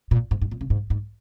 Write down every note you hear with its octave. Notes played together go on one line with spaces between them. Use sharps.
A#2
G#2
G#2
A#2
C#3
G#2
G#2